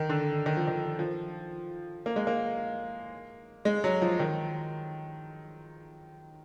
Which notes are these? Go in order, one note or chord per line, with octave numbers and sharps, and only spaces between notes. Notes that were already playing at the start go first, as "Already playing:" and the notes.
Already playing: D#3
D3
D#3
F3
D#3
F3
A#3
G#3
A#3
G#3
F#3
F3
D#3